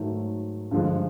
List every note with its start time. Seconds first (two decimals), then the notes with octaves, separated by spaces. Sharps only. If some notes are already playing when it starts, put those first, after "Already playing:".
Already playing: G#2 D#3 F#3 A3
0.71 G2 D3 F3 G#3